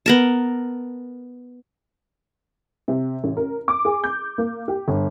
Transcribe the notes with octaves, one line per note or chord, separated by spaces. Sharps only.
B3 A#4 A5
C3
A1
A#4
D6
G#4
G6
A#3
G4
G1